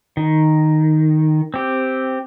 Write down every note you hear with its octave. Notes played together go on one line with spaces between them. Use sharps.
D#3
C4 G4